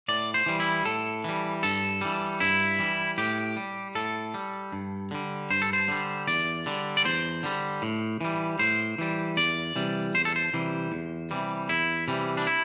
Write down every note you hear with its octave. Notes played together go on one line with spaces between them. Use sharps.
A2 D5
C5
E3 G3
E4
A2 A4
E3 G3
G2 A4
E3 G3
G2 E4
E3 G3
A2 G4
G3
A2 A4
G3
G2
D3 G3
G2 C5
A4
C5
D3 G3
E2 D5
D3 G3
D5
E2 C5
D3 G3
A2
E3 G3
A2 C5
E3 G3
E2 D5
C3 E3 G3
E2 C5
A4
C5
C3 E3 G3
E2
C3 E3 G3
E2 E4
C3 E3 G3
D4
E4